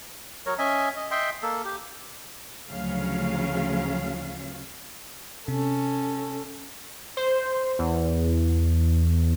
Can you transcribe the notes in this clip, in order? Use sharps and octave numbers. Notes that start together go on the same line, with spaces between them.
F#3 A#4 C#5
C#4 D#5 E5 G#5
D#5
D#5 E5 G5 C6
A#3 A4
G4
D2 C#3 F3 F#3 C#4 F5
C3 C#4 A4
C5
E2